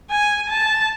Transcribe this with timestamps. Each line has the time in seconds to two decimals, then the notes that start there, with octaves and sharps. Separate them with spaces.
0.11 G#5
0.50 A5